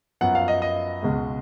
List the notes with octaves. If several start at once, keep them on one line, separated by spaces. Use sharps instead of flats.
F#2 F3 B3 F#5
F5
D#5
D#5
C#2 B2 G#3